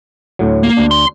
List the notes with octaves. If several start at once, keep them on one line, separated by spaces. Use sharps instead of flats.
D2 A2 F#3
A#3
D2 D4
C6